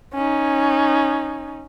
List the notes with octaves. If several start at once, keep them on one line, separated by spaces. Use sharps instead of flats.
C#4 D#4